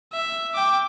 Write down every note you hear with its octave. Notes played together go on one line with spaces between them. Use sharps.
E5
G5 D6